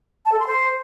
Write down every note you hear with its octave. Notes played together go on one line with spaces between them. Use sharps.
A5
A4
C6
C5